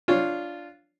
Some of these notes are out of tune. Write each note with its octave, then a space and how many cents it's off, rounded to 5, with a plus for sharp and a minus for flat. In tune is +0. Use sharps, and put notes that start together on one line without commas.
D4 +0 F4 -5 C#5 +0